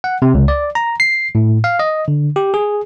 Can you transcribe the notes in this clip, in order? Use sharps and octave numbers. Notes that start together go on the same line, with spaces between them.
F#5
C3
C#2
D5
A#5
C7
A2
F5
D#5
D3
G4
G#4